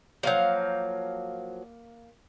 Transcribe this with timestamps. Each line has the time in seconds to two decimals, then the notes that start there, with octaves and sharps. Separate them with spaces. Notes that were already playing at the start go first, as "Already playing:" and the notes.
0.23 F3 F#3 A#3 F5 G6